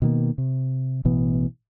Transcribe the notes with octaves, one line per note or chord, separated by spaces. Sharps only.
B2 D#3 A#3
C3
A1 B2 E3 B3